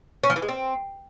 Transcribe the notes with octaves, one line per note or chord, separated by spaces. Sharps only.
C#4
F3
E3
G#3
C4